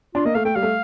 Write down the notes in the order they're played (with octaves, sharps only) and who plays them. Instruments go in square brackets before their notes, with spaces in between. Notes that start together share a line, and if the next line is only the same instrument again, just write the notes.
[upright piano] D4 [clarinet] F4
[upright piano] A#3 [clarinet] D#5
[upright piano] A3 [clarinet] F5
[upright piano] A3 [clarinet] G5
[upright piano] G3 [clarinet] F5
[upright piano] A3